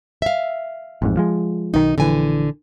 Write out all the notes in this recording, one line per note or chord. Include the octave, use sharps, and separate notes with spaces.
E5 F5
A1 F2 G#2
F3 G#3
B1 D#3 D#4
A#1 D3 E3 G#5